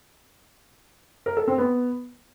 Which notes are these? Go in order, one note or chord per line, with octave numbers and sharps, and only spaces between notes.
A#4
A4
C4
B3